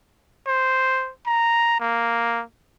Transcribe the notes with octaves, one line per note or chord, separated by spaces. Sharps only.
C5
A#5
A#3